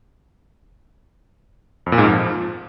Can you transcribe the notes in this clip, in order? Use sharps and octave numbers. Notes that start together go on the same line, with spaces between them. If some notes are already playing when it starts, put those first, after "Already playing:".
F2
A#2
G#2
F2
F3